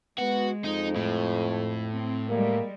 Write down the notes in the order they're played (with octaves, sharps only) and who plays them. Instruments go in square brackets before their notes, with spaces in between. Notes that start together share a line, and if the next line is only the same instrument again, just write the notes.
[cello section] G#3 [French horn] B3 [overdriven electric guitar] F#4
[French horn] F2 [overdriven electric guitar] D#4
[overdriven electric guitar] A2
[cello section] C4
[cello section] G3 G#3 [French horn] A#3